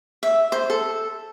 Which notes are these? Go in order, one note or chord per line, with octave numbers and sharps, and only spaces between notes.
E5
C5
A4